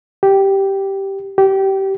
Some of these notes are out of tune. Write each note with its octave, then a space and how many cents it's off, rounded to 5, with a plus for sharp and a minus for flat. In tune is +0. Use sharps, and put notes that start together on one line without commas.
G4 -5
G4 -20